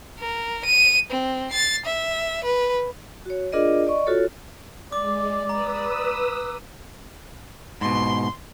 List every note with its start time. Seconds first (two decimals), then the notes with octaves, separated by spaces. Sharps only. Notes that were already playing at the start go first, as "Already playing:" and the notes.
0.20 A#4
0.65 D#7
1.11 C4
1.50 A6 C7
1.86 E5
2.44 B4
3.25 F#4 C#5
3.53 D4 F4 G#4 A#4 D5 D#5
3.87 D5 D#5 C#6
4.07 F4 F#4 A4 C#5
4.92 G#3 D5 D6
5.49 B4 A#5 D#6 E6
7.81 G#2 B2 C6